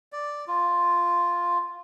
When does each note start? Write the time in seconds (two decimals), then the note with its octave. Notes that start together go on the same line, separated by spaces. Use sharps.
0.13 D5
0.48 F4